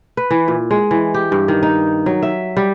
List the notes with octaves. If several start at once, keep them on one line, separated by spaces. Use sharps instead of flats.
B4
E3
A#2
G#3
E3
G4
G2
D#3
D#4
F#3
E5
G3